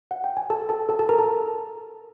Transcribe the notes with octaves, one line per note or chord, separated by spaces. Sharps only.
F#5
G5
G#5
A4 A5
A4 A5
A4 A5
A4 A5
A#4 A#5
A4 A5